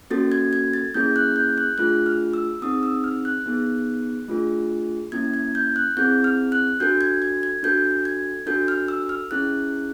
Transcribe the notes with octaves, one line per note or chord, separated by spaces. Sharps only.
A#3 C#4 F#4 A4 A6
G#6
G#6
A6
A#3 C#4 E4 G#4 G6
F#6
G6
F#6
A3 D4 F4 G#4 F#6
F6
E6
C4 D#4 G#4 D#6
E6
F6
F#6
B3 D#4 G#4
A3 D4 F4 G#4
A#3 C#4 E4 G#6
G#6
G6
F#6
C4 E4 G#4 G6
F6
F#6
D4 F#4 A4 G6
G#6
G#6
G#6
D4 F#4 A4 G6
G#6
D4 F#4 A4 G6
F6
E6
F6
C#4 E4 G#4 F#6